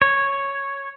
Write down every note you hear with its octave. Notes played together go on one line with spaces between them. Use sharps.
C#5